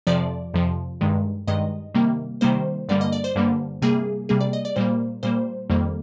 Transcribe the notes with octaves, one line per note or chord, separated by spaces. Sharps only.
F2 C3 F3 D5
F2 C3 F3
G2 D#3 G#3
G2 D#3 G#3 D#5
C3 D#3 G3 A#3
C3 D#3 G3 A#3 C5
G2 D3 G3 A#3 D5
D#5
D5
C5
G2 D3 G3 A#3
C3 G3 A#3 G#4
C3 G3 A#3 G#4
D5
D#5
D5
A#2 G3 A#3 C5
A#2 G3 A#3 C5
F2 D#3 G3 A#3